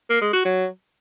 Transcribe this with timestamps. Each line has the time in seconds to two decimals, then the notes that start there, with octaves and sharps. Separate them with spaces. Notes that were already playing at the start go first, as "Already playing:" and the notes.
0.10 A#3
0.21 G#3
0.33 F#4
0.45 F#3